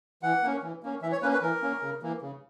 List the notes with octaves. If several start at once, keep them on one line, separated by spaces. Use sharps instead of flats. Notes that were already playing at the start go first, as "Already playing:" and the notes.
E3 F#5
A#3 C#4
E3
A#3 C#4
E3 E5
C#5
A#3 C#4 B4
B4
E3 A#4
A#3 C#4
C#3
E3 A#3
C#3